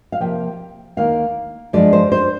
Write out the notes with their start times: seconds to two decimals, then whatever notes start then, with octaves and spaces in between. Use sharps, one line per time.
0.12 F5
0.20 C3 F3 A#3 G5
0.97 D#2 D#3 A#3 F5
1.73 G2 F3 G#3 D5
1.93 C5
2.12 C5